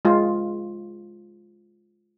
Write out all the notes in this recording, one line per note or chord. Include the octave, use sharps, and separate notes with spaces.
G#3 F4